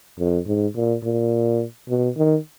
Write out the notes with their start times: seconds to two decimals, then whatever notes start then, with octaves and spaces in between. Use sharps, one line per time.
0.19 F2
0.47 G#2
0.76 A#2
1.04 A#2
1.89 B2
2.17 D#3